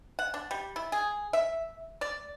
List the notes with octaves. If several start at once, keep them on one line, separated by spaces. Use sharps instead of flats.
F#5
D4
G3
E4
G#4
E5
D5